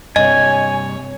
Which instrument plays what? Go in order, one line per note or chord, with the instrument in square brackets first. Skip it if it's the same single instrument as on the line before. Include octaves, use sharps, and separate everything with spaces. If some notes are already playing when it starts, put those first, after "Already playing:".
[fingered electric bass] G2 C3 [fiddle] C#5 [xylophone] D#5 [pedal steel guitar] G#5